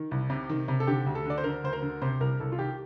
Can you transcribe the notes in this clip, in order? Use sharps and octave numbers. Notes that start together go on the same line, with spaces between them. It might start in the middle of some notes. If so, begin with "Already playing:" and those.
Already playing: D#3
C2
C3
D#3
C3
A4
D3 G4
D2
A4
D3 D5
C5
D3 A#4
D2 C5
A#4
D3
C3 C5
C2 A#4
C2 A4
F4
D#3 G4